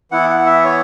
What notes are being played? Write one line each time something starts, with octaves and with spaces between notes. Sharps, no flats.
E3 B3 E4 F#5
F#5
E5
C#5